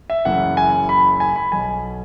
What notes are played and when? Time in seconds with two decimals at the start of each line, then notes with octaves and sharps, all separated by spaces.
0.10 E5
0.25 F#1 F#2 E3 F#5
0.57 G#5
0.89 B5
1.20 G#5
1.36 B5
1.52 B1 B2 G#5